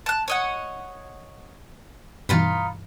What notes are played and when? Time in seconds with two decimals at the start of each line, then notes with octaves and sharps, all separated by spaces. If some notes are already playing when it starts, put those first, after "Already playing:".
0.06 A5 F#6
0.28 C#5 D#5 F#5
2.29 G2 B2 E3 D#4 F4 B5